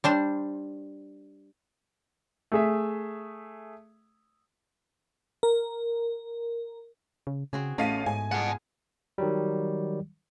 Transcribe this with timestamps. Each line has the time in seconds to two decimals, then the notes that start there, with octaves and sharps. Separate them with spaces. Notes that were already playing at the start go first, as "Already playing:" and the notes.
0.04 G3 D4 C5
2.52 A3 G#4 E5
5.43 A#4
7.27 C#3
7.53 C#3 C4 F#4 G#4
7.78 A1 A3 B3 C#4 D#5 F5 D#7
8.06 G#2 G#5
8.32 B3 F4 G#4 F#5 A5
9.18 D#3 F#3 G3